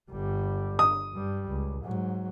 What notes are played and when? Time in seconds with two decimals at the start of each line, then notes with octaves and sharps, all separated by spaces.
0.11 G1 G3
0.79 D#6
1.14 G2 G3
1.49 C#2
1.84 G#2 F#3